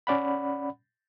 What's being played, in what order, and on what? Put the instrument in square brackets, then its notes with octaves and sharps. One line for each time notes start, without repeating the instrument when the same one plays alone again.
[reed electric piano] C#4 D5 F#5 B5